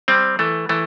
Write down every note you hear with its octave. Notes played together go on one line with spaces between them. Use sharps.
G3 C4
E3 A3
E3 A3